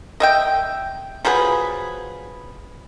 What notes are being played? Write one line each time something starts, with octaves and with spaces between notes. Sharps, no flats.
D#5 E5 G5
F3 F#3 G#4 B4